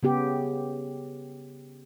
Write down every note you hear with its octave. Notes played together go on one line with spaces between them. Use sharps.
C#3 B3 G4